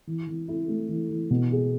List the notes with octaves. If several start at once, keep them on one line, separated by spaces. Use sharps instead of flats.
E3
E3
E4
A3
E3
E3
B2
G#4